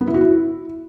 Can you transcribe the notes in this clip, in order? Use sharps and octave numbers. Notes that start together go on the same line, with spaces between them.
B3
E4
F#4
E4